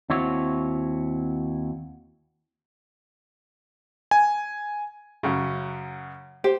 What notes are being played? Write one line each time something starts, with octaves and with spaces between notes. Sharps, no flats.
D#2 C4 E4 F#4 C#5
G#5
F#2 C#3
G4 C5